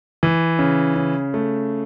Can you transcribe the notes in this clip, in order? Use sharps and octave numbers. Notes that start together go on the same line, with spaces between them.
E3
C#3
C#3
A3